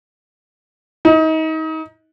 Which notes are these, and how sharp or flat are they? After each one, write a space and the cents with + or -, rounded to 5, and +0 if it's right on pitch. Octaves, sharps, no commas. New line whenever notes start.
D#4 +30